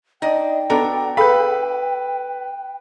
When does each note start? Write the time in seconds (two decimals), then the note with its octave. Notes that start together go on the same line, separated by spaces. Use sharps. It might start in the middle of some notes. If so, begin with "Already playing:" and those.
0.22 D4 D#4 D#5 G5
0.70 B3 D4 F#4 A4 A#5
1.17 G#4 A4 B4 F5 B5